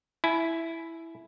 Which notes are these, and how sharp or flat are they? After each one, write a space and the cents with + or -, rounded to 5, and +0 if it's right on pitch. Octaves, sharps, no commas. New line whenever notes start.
E4 +0 G#5 +35